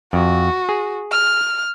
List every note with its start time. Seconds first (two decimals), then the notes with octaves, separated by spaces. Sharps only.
0.13 F2 F#4
0.69 G#4
1.12 F6